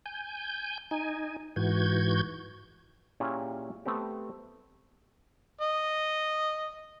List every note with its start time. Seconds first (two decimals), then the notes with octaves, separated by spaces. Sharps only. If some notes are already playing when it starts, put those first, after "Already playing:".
0.06 G#5 G6
0.91 D#4 G#5
1.56 G#2 E3 F#4 G6 G#6
3.20 A#2 C#4 E4 F4 G4 G#4
3.86 A3 B3 C4 G4
5.61 D#5